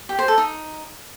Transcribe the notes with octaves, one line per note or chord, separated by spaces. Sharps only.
G4
C5
A4
D#4